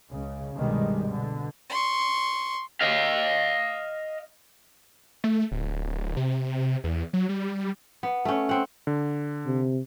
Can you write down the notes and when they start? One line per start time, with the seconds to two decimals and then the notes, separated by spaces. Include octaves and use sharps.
0.12 C#2 C#3
0.55 C2 G2 B2 D#3 G3 G#3
1.10 B2 D3
1.70 C6 C#6
2.81 D#5 F5
5.24 A3
5.51 D1
6.17 C3
6.84 E2
7.13 F#3
7.29 G3
8.03 B3
8.25 A3 C#4
8.49 C4 F#5
8.87 D3
9.46 C3